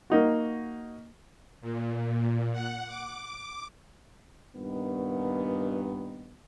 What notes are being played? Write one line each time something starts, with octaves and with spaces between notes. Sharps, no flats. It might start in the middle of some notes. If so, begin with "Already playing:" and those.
A#3 D#4 F#4
A#2
F#5
D6
G2 A#2 D#3 B3